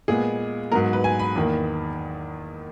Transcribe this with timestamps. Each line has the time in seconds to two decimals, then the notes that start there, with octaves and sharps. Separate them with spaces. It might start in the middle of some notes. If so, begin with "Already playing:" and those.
0.08 A#2 G#3 B3 G#4
0.71 G#2 F#3 B3 A#4
0.93 B4
1.04 G#5
1.19 B5
1.36 E2 D#3 A#3